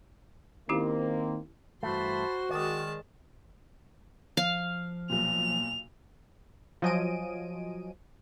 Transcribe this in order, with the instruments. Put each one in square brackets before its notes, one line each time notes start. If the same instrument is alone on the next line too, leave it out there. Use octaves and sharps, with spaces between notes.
[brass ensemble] D#3 A#3 C4 [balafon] C#4 E4 G4
[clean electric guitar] G2 E3 A3 [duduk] F#4 [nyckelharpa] C5 C6 [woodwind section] A5 B5
[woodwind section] D#3 [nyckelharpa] G#3 A5 [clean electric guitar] D5 D#5
[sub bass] F3 [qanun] F5
[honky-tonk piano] B1 A#2 [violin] F7
[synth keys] F3 F#3 D#5 G#5 D7 D#7